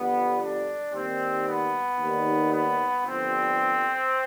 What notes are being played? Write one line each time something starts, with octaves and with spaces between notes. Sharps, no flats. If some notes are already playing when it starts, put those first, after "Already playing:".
Already playing: G1 F2 D3 G3 B3
D4
D#2 D#3 G3 C4
B3
D#2 D#3 G3
B3
G1 G2 D3 F3 C4